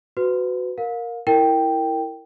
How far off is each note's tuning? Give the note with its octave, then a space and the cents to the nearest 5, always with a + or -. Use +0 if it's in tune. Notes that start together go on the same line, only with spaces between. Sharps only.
F#4 +0 B4 +25
A#4 +0 F5 +30
E4 +0 A#4 -15 G5 +0